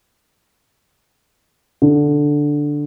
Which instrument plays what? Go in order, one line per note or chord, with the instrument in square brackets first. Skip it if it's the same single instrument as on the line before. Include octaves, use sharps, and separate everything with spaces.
[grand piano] D3